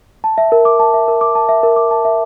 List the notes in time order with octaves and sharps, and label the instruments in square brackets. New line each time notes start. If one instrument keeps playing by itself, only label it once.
[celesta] A5
E5
A#4
D6
A5
E5
A#4
D6
A5
E5
A#4
D6
A5
E5